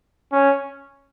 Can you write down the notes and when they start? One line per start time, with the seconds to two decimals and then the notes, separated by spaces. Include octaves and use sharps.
0.32 C#4